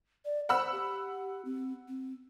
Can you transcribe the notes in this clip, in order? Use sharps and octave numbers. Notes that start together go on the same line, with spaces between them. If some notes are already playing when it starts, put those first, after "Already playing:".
D5
C5 F#5 B5 E6
G4
C4
C4